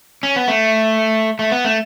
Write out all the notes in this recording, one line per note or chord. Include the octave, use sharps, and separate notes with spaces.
C#4
B3
A3
A3
B3
A3